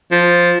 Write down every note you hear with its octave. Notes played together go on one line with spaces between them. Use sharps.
F3